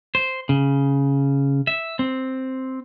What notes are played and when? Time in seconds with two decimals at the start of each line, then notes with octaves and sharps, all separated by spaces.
0.15 C5
0.49 C#3
1.67 E5
1.99 C4